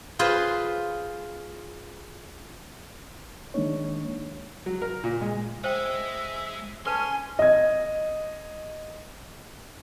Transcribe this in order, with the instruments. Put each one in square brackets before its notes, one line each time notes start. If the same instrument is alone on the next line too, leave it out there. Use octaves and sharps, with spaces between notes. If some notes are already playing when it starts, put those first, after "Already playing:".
[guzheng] F4 G#4 B4 C5
[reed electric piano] D#3 G#3 A#3 D4 D#4 C#5
[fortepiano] F#3
A#4
A#2
G#3
[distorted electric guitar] G#3 D#5 [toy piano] C5 G5 [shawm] E5
[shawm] C#4 [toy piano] A4 B4 A5 [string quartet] G#5 [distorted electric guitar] C6
[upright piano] D#5 G#6